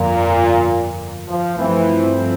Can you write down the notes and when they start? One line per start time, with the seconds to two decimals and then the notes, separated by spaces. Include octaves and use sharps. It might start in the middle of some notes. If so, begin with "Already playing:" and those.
Already playing: G1 F2 A#2 D3
1.28 F3
1.57 G2 E3 F3 A3 C4